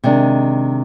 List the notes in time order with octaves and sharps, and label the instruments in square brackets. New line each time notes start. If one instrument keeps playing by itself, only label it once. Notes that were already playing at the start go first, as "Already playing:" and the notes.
[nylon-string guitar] C3 D#3 G#3 D4